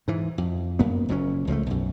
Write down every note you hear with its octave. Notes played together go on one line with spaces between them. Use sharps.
G#2 E3
F2
F#2 A#3 B3
F#1 A#2 F#3 C#4
C#2 F3 F#3 A3
B1 F#2